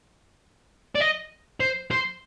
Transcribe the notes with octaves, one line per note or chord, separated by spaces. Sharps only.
D5
D#5
C5
C5